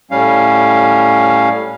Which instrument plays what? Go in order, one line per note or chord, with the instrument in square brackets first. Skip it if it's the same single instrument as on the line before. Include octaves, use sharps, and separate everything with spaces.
[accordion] A2 G3 C#4 F5